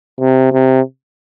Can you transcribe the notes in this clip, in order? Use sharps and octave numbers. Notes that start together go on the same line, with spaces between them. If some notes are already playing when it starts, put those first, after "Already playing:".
C3
C3